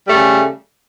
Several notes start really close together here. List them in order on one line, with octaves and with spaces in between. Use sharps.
G3 A3 C#3